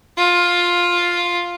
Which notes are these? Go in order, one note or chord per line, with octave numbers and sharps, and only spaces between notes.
F4